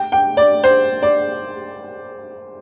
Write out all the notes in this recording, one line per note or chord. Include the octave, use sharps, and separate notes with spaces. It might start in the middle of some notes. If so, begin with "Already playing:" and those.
Already playing: G5
G5
D5
C5
D5